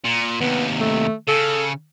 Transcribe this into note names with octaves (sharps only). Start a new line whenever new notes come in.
A#2
D#2 C3 B3
A3
C#3 A4